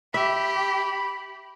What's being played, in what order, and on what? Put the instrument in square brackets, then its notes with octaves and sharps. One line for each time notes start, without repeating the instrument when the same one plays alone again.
[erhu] G4 [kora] E5 [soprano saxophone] B5